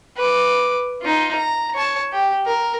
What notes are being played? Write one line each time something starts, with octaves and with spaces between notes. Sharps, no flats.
B4 D6
D#4 F4
A#5
C#5 A5
G4
A#4